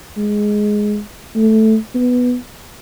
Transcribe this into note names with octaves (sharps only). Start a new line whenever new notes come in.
G#3
A3
B3